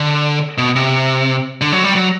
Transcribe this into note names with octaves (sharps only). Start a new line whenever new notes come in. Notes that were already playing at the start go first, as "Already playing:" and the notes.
Already playing: D3
B2
C3
D3
F#3
G3
F#3